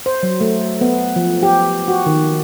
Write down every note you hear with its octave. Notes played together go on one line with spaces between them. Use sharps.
C5
F#3
A3
B3
F3
G4
F#4
D#3